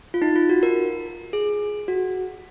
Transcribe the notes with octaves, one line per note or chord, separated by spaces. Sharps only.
F4
D#4
F4
F#4
A#4
G#4
F#4